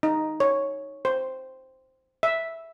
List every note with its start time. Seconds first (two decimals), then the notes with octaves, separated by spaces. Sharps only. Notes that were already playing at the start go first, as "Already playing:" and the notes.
0.03 D#4
0.40 C#5
1.05 C5
2.23 E5